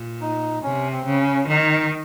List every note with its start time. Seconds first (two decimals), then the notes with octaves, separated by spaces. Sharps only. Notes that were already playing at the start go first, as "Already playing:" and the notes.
Already playing: A#2
0.21 D#4
0.63 C3 C#4
0.92 C4
1.06 C#3
1.21 C#4
1.48 D#3 D#4